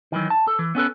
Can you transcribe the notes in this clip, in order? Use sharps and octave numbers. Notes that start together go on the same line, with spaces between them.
D#3 E3 F#3
A5
A4
E3
B3 C#4 A4 B4